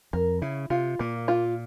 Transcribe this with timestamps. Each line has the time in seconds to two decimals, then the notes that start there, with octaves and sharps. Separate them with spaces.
0.13 F2 A#4
0.42 C#3 E4
0.70 C3 F4
0.99 A#2 A#3
1.28 F4